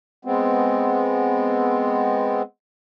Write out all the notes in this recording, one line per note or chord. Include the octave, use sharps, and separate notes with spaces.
G#3 B3 C4